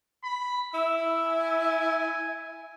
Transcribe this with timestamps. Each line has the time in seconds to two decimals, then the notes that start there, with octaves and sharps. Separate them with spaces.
0.24 B5
0.74 E4 E6
1.25 G#5